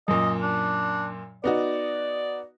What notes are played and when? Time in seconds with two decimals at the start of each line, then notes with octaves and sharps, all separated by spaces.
0.08 F#2 A#2 D#5
0.42 D4
1.44 B3 D#4 F#4 D5